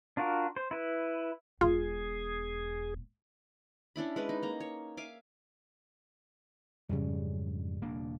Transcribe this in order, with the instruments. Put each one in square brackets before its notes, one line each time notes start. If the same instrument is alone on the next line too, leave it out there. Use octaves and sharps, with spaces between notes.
[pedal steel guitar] D4 F4 F#4 A#4
C5
E4 B4
[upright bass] E1 B2 [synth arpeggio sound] F4 [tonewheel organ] G#4
[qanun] C#4 D4 E4 B5
G#3 B4 A5
D#4
A#3 A#5
C#5
E5 F5 G#5 D6
[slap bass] F2 G#2 F#3 [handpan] C#3 G3
[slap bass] E1 A#3 D4